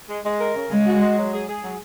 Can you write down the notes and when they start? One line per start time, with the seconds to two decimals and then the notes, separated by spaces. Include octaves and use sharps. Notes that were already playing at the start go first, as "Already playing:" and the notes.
0.09 G#3
0.24 G#3
0.39 A#4
0.55 C#3
0.70 C#3 G#3
0.86 F#4
1.01 G#3
1.17 F#3
1.32 G#4
1.48 G#4
1.63 F#3